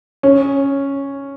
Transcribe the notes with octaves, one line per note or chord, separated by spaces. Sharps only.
C#4